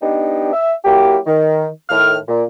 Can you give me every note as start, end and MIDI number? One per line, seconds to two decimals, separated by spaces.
0.02 0.52 59
0.02 0.52 62
0.02 0.52 63
0.02 0.52 67
0.53 0.73 76
0.85 1.18 54
0.85 1.18 58
0.85 1.18 64
0.85 1.18 66
0.85 1.18 67
1.27 1.66 51
1.90 2.17 45
1.90 2.17 51
1.90 2.17 89
2.28 2.43 46